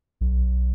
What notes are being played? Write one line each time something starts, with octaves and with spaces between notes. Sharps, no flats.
B1